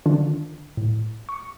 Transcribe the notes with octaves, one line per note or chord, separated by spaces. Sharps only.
D3 D#3 D4 F4
A2
C#6 C#7